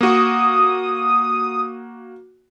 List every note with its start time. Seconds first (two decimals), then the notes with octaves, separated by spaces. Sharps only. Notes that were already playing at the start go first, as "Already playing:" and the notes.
0.01 A#3 F#4 D#6